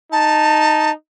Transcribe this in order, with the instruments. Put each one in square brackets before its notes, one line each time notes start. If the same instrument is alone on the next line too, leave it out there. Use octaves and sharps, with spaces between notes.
[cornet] D#4 [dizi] A5